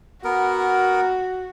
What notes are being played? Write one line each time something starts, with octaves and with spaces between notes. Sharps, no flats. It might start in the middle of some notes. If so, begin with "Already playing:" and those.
B3 F#4 A#4